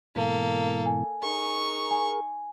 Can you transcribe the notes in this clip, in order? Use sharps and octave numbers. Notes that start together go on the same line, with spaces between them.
G#2 B2 E3 A#3 A4
G#5
D#4 G#4 A#4 C#6
G#5